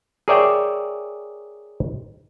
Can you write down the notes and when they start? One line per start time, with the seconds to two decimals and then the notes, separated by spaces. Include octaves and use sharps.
0.28 G#4 A#4 C#5 D5 E5 G5